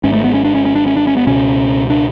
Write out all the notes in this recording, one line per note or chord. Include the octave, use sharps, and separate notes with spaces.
G#1 G#2 C#4
A3
B3
C#4
D4
C#4
C#4
D4
C#4
D4
C#4
B3
C#2 B2 C#4
D4